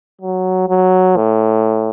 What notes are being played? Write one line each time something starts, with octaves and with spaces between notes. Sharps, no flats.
F#3
F#3
A2